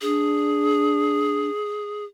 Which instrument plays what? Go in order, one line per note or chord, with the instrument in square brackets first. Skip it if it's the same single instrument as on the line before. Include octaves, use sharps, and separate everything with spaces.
[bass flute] D4 [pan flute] G#4